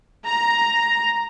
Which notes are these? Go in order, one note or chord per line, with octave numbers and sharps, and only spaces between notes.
A#5